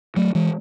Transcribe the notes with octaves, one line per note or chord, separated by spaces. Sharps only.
F#3 A3
E3 G#3